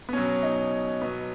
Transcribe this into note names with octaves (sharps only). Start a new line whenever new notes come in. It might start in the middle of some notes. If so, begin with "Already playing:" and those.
B3
B2 F#3 C#4
D#4
B2 F#3 B3